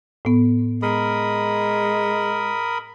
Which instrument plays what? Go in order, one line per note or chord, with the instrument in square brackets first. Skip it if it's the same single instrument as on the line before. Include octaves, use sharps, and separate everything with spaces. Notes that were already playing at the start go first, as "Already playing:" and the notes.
[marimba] A2 B3
[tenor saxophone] G#3 [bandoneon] A#4 B5 D#6